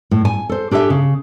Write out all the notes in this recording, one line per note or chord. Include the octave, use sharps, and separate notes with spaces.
A2
G#5
A4 C5
D4 G4 A4 B4 E5 G#5
C#3